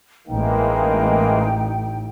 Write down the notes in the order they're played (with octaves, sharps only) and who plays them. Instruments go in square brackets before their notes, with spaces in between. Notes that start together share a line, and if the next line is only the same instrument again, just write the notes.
[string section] A1 [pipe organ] E3 G#3 A#3 [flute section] D#4 G5